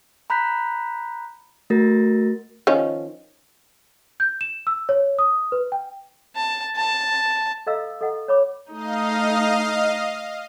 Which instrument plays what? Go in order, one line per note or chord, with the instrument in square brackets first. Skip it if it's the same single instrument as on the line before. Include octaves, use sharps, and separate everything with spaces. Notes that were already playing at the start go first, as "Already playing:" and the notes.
[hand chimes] A#5 B5 F#6 G6 B6
A3 F#4 A#4 A6 A#6
[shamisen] D#3 F3 C#4
[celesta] G6
E7
E6
C#5
D#6
B4
G5
[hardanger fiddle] A5
A5
[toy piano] A4 D#5 F5 A#5 E6
A4 D#5 F#5 A#5
C#5 B5 D6
[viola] A3 D#4 [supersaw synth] D#5 F5